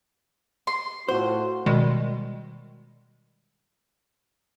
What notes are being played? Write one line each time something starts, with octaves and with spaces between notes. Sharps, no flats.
C6
A2 F4 F#4 C5
B2 D#3 G3 G#3